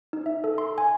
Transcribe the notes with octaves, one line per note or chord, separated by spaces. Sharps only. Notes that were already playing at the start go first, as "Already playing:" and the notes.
D#4
E5
A4
C6
G#5